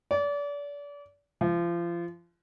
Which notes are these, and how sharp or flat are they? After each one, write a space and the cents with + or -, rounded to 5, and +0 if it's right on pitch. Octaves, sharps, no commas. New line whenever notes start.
D5 -35
F3 -30